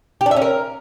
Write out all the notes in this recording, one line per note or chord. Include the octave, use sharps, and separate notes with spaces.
G4
D4
E5
C#4
A#4